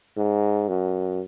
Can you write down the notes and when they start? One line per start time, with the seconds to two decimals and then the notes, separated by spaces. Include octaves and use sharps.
0.17 G#2
0.68 F#2